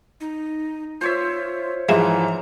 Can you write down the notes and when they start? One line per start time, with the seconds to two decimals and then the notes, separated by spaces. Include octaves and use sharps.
0.21 D#4
1.01 F4 C5 C#5 E5
1.89 G#2 E3 F3 G#3 E4 A#5